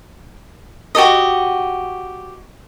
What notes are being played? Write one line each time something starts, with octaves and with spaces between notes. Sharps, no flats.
F#4 G4 A4 D#5